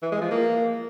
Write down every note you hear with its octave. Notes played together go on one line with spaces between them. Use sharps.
E3
G#3
F3
A#3